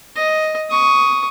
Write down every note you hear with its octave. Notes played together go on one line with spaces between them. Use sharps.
D#5
C#6 D#6